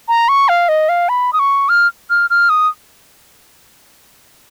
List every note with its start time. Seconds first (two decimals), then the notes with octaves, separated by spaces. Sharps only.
0.08 A#5
0.29 C#6
0.49 F5
0.69 D#5
0.89 F5
1.09 B5
1.33 D#6
1.39 C#6
1.69 F6
2.10 F6
2.30 F6
2.49 D#6